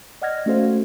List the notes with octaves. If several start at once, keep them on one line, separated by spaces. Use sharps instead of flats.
D5 D#5 F#5 F6 G#6 A#6
A3 C#4 F#4 A4 C5 F5